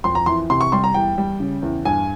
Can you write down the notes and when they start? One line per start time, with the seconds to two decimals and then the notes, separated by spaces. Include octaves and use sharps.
0.04 F2 C6
0.15 A#5
0.26 E3 C6
0.50 C3 C6
0.61 C#6
0.72 G3 C6
0.84 A#5
0.94 E2 G5
1.18 G3
1.40 C#3
1.62 E2
1.85 G2 G#5